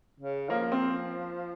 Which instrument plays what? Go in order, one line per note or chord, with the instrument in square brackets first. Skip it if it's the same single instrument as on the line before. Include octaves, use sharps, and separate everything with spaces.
[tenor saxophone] C#3
[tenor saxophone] F3 [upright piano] A#3
[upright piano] C4